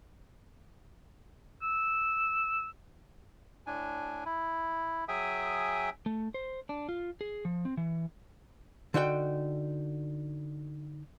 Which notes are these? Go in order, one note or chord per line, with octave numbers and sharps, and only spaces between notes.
E6
A2 D4 G#5
E4
F#3 G#4 E5 G5 G#5 D#6
A3
C5
D4
F4
G#4
F3
C4
E3
D3 D#4 F#4 G5